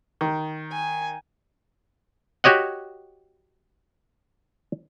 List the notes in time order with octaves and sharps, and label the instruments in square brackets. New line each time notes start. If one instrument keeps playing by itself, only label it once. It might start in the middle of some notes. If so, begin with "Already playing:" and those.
[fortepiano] D#3
[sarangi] G#5
[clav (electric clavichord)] F#4 G4 C#5 D#5 F#5